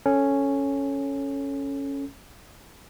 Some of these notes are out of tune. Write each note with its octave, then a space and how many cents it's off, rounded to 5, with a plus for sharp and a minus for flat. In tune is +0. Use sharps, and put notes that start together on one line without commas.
C#4 +0 A4 +0